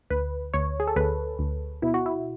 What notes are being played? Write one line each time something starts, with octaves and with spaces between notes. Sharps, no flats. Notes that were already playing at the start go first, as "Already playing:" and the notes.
D2 B4
D2 C#5
G#4
A4
D2 B4
D2
B2 E4
F#4
E4